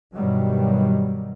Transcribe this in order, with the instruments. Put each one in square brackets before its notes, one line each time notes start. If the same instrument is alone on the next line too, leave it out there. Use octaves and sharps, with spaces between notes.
[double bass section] G2 B2 D#3 F#3 G3